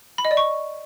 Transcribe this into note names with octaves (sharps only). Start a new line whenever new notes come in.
B5
D#5
D5
C#6